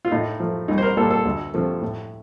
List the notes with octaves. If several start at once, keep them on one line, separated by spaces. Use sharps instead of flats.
F4
A2 D#4
F3 A3
C2 D#4
C5
A#4
A#2 G3 A4
A4
D2
C3 F3 A3
A2